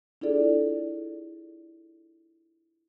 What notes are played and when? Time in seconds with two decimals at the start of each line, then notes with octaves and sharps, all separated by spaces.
0.21 D4 E4 F4 G#4 A4 D5